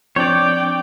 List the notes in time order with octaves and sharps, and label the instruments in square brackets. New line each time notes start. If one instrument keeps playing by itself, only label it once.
[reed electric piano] F3 C4 D4 [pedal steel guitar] C#5 D5 [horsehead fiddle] G5